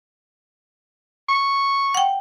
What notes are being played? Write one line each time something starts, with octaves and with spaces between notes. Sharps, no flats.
C#6
F#5 G5